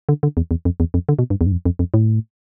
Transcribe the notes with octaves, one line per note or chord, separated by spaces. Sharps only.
D3
D3
E2
E2
F2
E2
F2
D3
B2
G2
E2
G2
F2
F2
F2
A2